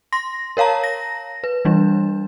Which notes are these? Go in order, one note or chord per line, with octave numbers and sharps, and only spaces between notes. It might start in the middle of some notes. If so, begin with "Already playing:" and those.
C6 A#6
A#4 C#5 F5 A5 A#5
A#6
B4
E3 G3 D4